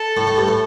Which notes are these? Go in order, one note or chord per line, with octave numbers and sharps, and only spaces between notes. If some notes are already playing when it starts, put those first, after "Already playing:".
Already playing: A4
A2
A2
G2
A2